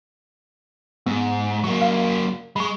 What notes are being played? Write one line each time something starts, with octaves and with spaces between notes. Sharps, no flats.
G#2 B3
F#3 A#3 C#6
F5
G#3 B5 C#6